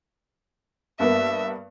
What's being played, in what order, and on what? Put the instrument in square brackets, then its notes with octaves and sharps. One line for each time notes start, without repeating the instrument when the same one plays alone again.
[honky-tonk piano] G2 A#3 B3 [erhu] E5